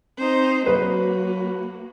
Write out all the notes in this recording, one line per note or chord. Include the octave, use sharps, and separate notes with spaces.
C4 D#4 C5
F#3 A#3 F#4 B4